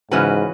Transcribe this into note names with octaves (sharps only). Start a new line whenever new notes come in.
G#2 C#3 E3 C#4 F#4 B4